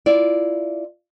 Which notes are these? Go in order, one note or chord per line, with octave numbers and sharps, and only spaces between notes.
E4 F4 D5